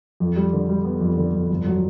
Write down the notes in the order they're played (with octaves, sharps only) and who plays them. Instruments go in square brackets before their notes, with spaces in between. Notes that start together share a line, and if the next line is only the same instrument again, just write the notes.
[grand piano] F2
G3
D3
G3
B3
F2
D3
F2
G1
F#3